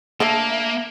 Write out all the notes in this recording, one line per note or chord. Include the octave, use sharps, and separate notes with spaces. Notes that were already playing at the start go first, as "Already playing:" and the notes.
A3 A#3 D4 A4 E5